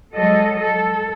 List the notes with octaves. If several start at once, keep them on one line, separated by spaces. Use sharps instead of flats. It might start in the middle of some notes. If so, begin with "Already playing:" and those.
F#3 G#3 A4 D#5
A4